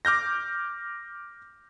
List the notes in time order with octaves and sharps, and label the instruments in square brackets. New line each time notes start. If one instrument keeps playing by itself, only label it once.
[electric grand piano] D6 F6 G6 A#6